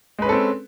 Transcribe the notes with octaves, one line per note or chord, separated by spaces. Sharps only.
G#3 C4 C#4 A4 B4